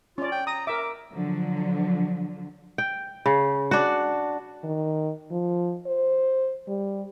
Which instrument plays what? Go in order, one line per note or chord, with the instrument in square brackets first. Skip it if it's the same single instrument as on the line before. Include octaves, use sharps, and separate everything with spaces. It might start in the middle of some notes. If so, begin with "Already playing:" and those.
[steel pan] C#4 D5 [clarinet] F4
[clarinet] G5
[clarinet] A#5 [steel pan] D#6
[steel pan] A#4 E5 [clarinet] D6
[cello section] D3 F3 F#3
[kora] G5
C#3
D4 F#4
[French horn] D#3
F3
C5
G3